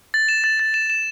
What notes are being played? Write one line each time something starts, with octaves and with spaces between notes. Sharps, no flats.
A6
E7
A6
A6
E7
E7